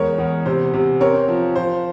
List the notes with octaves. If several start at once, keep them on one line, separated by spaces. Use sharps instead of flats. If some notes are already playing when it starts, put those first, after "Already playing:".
Already playing: E2 G#3 A#4 C#5
E2
C3 C5
C3
C4 A#4 C#5
F3
F3 C5